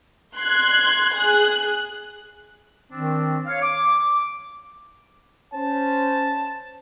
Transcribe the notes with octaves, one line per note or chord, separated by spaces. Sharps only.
C6 F#6 G#6
G#4 F#6
D#3 C4 D4
C#5 F5
D6
C#4 C5 A5